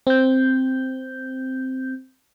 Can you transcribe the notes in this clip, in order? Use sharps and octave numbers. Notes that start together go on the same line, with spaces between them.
C4 G6